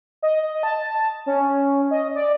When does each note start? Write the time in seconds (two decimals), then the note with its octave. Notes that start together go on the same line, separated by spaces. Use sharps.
0.23 D#5
0.63 A5
1.26 C#4
1.91 D#5
2.15 D5